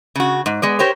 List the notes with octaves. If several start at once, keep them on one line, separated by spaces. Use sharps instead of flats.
C#3 F#4
G#2
G#3 B3 D5
G4 A#4 C5 C#5